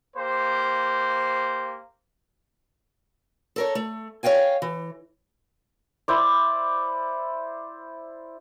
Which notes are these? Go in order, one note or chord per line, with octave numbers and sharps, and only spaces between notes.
A#3 G4 C5
A4 A#4 C#5
A3
C#5 D#5 F5 G5 G#5
E3
E4 C5 D5